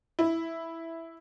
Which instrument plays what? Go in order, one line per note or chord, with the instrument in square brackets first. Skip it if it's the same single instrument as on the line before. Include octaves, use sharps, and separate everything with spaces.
[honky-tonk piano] E4